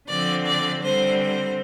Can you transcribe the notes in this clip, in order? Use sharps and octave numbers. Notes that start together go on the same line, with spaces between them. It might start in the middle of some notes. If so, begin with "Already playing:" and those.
D3 F3 C4 D5
D5
D3 G3 C4 C5
C5